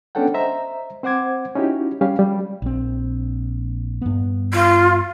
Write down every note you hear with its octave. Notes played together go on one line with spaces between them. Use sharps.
B3 C#4 D4 A4 F#5 G5
C5 D#5 E5 A#5
C4 C5 F#5 D6 G#6
C#4 D#4 E4 F#4 G4
G3 C#4 G4 F5
G3
A#1 C4
G2 B3
F4